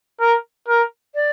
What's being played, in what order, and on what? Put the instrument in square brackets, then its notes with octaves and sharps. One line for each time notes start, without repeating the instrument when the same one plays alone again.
[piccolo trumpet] A#4
A#4
[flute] D5